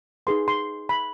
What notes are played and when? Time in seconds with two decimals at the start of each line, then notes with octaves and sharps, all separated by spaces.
0.27 D#4 G#4 B4 C6
0.48 C6
0.89 B5